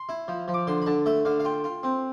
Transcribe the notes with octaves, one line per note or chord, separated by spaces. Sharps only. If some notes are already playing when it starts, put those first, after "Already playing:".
Already playing: C6
E4
F3
F3
D6
D3 C6
B5
D3 A5
A3 E5
D3 F5
F5
F4 G5
F4
C4